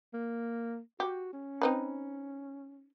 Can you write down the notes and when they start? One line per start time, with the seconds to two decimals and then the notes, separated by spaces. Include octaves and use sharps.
0.13 A#3
1.00 F#4 G4
1.33 C#4
1.61 C4 D#4 B4